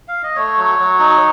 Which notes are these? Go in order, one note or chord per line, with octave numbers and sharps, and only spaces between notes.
F5
D#5
A3 C#5
F#3
F#3
D#4